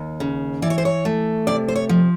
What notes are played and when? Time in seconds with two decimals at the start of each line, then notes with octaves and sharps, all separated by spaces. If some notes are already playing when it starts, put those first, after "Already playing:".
Already playing: D#2
0.20 C#3
0.62 E3 D5
0.70 C#5
0.78 C5
0.85 C#5
1.05 A3
1.47 C3 D5
1.68 C5
1.75 C#5
1.89 F3